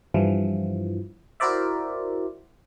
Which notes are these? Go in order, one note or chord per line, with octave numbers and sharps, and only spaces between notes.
G2 E3 F3
E4 F#4 A#4 C5 D5 E5